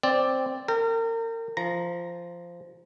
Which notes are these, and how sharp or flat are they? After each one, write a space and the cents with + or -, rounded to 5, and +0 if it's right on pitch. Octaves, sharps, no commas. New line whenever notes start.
C4 +0 D5 +0
A#4 -35 G5 +0
F3 -10 A#5 +0